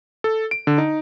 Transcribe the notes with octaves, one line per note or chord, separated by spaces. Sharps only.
A4
D7
D3
D#4